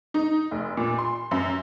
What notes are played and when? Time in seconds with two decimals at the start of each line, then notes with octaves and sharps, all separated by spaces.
0.14 D#4
0.51 F1
0.77 A#2
0.98 C6
1.31 F#2